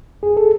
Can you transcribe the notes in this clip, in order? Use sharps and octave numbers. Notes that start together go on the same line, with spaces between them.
F2 G#4
A4